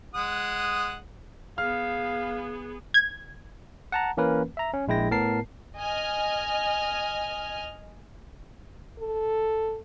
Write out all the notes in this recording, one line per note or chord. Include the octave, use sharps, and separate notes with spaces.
G#3 F#5 D#6
B3 G#4 F5 F6
G#6
F#5 A5 A#5
E3 A#3 C#4 A#4 B4
E5 A#5
C#4
A#1 G#3 E4 G5 A#6
A2 B3 A#4 A5 C7
D#5 G#5 F6
A4